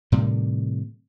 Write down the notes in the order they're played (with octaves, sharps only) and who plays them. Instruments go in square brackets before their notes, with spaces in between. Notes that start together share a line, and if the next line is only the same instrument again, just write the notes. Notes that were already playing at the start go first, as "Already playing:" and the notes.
[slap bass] A2 C3 D#3 G3